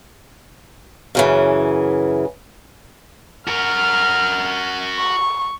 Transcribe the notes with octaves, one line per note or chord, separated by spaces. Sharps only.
F#2 C#3 E3
F#4 A#4 F6
C#6